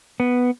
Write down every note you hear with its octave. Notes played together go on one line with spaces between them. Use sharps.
B3